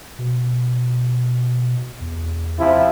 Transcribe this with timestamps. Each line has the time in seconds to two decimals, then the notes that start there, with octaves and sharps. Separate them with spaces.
0.19 B2
2.01 E2
2.58 C3 F3 E4